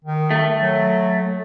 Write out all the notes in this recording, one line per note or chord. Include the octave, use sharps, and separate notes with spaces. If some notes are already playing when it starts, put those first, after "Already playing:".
D#3
A3
F#3